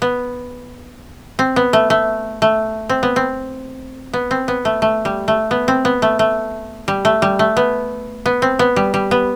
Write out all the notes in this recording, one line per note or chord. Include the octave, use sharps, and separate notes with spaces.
B3
C4
B3
A3
A3
A3
C4
B3
C4
B3
C4
B3
A3
A3
G3
A3
B3
C4
B3
A3
A3
G3
A3
G3
A3
B3
B3
C4
B3
G3
G3
B3